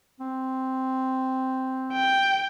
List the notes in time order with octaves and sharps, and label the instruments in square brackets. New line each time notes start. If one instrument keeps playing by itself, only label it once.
[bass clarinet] C4
[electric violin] G5